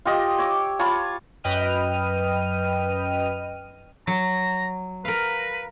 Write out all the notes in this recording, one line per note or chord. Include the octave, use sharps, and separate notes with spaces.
F4 G4 D#5
C#5 D6 E6
F4 C#5 A5 B5
F#2 B4 D#5 G5 F6 D#7
F#3 A#5
A#4 B4 F5